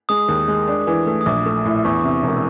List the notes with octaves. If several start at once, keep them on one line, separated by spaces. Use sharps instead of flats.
G#3 D#6
D#2
G#3
D4
E3
A3
D#6
A#1 D6
A3
A2
E2 C#6
C3
E1